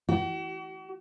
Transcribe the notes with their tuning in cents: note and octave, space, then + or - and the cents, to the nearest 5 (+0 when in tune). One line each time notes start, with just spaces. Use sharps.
F#4 +45